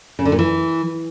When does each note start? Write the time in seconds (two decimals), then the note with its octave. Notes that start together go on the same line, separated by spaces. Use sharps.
0.19 C#3
0.25 D3
0.32 A#2
0.39 E3